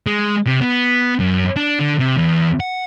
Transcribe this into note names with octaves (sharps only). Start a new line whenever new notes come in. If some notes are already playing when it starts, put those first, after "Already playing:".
G#3
C3
B3
F#2
D4
D3
C3
E2
F#5